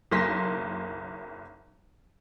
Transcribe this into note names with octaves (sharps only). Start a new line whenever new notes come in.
F#1 B1 A#3 C6 A#6 B6